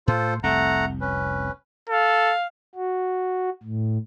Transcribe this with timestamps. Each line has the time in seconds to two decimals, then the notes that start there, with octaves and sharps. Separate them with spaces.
0.08 A2 F4 A4 C5
0.43 F1 C2 A3 C4 F#5 A#5
1.01 C#4 B4
1.89 A4 F5
2.75 F#4
3.63 A2